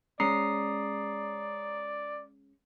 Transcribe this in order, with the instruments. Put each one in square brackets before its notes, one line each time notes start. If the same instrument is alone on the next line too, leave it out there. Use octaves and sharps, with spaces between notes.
[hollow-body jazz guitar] G#3 C#4 [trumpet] D5 [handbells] A#5 D#6 C7